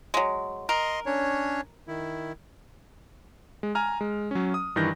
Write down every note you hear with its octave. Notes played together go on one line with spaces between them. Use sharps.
F#3 G#3
A#4 D#5 C6
C#4 D4 C#5
D#3 E4
G#3
G#5 A#5 F6
G#3
F#3 C#4
D#6
G2 D#3 E3 G6 A#6